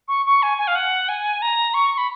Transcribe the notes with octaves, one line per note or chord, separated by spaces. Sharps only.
C#6
C#6
G#5
G#5
F5
F#5
G#5
A#5
C#6
B5